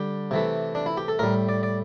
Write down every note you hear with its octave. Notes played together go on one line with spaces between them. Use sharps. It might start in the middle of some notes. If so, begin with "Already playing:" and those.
Already playing: D3 G3 G4
C3 E3 A3
D4
E4
G4
A4
A2 G3 A#4
D5
D5